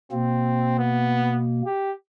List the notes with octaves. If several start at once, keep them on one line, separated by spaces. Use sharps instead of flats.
B2 A#3 C4
B3
G4